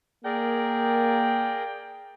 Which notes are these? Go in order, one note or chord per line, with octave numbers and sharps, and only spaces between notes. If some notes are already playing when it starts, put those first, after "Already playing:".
A#3 G#4 A#4 D5 G5